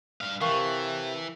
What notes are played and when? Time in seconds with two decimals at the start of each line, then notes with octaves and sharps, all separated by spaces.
0.21 G2 F5
0.41 C3 E3 A#4 F5 G5 A5 C#6